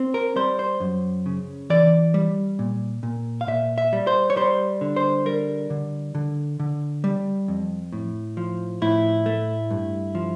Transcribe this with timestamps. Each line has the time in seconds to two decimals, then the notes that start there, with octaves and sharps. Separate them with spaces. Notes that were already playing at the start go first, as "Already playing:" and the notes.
Already playing: C4
0.14 A#4
0.36 G3 C5
0.59 C5
0.80 F#2
1.26 C#3
1.70 E3 D5
2.14 G3
2.59 A#2
3.03 A#2
3.41 F5
3.47 A#2 E5
3.78 E5
3.93 G3
4.07 C5
4.30 C#5
4.36 G3 C5
4.81 D3
4.96 C5
5.26 G3 A#4
5.70 D3
6.15 D3
6.60 D3
7.04 G3
7.48 F2
7.93 A2
8.37 F3
8.82 A2 E4
9.26 A3
9.71 G2
10.15 F3